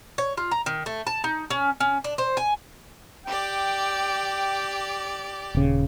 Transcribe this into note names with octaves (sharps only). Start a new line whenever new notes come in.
C#5
F4
A#5
D#3
A3
A5
D#4
C#4
C#4
D4
C5
G#5
G4 D5 G5
D#1 C#3